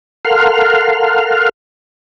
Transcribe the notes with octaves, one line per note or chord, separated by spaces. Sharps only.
A4 A#4 F5 F#5 C6 F6